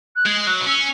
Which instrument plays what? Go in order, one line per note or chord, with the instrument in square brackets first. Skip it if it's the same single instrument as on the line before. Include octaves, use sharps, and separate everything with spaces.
[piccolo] F#6
[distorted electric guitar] G#3 [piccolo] G#6
[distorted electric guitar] F#3 [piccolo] F#6
[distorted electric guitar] B3
[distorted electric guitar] C#4 [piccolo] E6